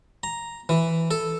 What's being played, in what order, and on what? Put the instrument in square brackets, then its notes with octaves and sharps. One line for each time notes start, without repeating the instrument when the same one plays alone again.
[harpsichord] A#5
E3
A4